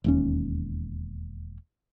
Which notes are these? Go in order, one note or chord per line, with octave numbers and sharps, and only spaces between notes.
E1 D#2 C#4